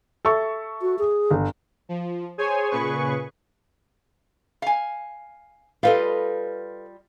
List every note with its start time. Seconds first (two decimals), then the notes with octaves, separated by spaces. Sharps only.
0.25 A4 E5 C#6
0.82 F#4
0.99 G#4
1.31 G1
1.89 F3
2.38 G#4 C5 C#5 G#5
2.71 A#2 C#3 G#4 B4 C#6
4.62 F5 G#5
5.83 G3 F4 A4 B4 D#5 F5